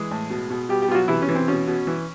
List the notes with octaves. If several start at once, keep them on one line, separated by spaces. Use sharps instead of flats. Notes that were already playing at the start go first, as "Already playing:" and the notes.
Already playing: E3 G#3 G#4
A2
B2
B2
B2 G3 G4
G3 G4
B2 F4
F#3 F#4
C3 E3 E4
C#4
E3
C4
B2 C#4
B2
E3